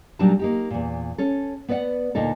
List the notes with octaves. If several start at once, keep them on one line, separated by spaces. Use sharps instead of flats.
A#2 F#3 G3 D4 D#4 A5
A#3 D#4 G4
E2 A#2
C#4 A4
B3 B4 D5 D#5 F#5
D2 A#2 D#4 A4